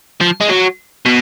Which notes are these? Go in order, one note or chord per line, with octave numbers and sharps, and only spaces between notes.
F3
G#3
F#3
B2